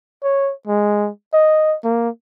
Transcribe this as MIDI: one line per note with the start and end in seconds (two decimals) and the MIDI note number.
0.23 0.52 73
0.67 1.09 56
1.33 1.76 75
1.84 2.09 58